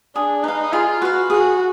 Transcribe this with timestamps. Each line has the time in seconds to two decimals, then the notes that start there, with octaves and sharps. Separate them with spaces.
0.15 D4 G#4
0.44 D#4 B4 F5
0.73 F4 G#4
1.02 F#4 B4 F5
1.30 F#4 G#4